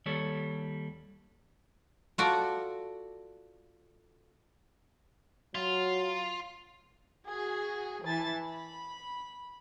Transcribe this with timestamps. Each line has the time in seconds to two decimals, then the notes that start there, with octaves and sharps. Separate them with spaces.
0.06 D#2 G3 A4 C#5
2.18 F4 F#4 A4 D5
5.55 F#3 F4
7.27 F#4 G#4
8.03 E3 G#5 A5 A6
8.43 B5